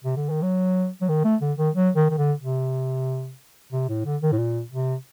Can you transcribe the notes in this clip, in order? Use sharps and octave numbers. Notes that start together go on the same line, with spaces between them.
C3
D3
D#3
F#3
F#3
D#3
A3
D3
D#3
F#3
D#3
D#3
D3
C3
C3
A2
D3
D#3
A2
A#2
C3